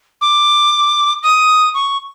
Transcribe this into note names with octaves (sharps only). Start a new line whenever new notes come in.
D6
D#6
C#6